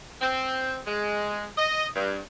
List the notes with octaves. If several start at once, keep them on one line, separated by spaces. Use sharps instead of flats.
C4
G#3
D#5
G2